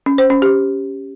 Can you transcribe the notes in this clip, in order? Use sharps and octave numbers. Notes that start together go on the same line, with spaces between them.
C#4
C5
C#4
G4